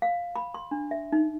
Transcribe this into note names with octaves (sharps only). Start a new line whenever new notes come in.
F5
B5
C6
D4
E5
D#4